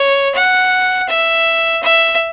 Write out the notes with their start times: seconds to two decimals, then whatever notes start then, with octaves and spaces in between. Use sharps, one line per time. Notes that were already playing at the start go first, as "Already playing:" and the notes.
Already playing: C#5
0.35 F#5
1.09 E5
1.83 E5